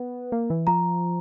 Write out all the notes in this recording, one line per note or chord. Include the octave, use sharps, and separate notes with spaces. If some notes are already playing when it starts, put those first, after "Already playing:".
Already playing: B3
A#3
E3
F3 A#5